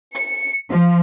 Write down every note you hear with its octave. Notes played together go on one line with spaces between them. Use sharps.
C#7
F3